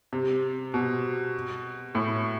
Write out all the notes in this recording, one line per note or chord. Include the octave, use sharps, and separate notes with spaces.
C3
B2
A2